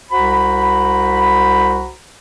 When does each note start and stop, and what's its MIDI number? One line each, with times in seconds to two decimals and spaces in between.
0.11 1.92 36
0.11 1.92 66
0.11 1.92 72
0.11 1.92 82
0.11 1.92 83